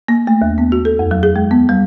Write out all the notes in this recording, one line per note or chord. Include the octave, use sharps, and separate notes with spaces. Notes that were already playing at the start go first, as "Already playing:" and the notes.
A#3
A3
D#2
B3
F#4
A4
F2
F#3
G#4
G#3
B3
G3